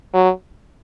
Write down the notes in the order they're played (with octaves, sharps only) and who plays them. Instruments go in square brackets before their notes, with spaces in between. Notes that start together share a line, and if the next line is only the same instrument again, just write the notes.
[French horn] F#3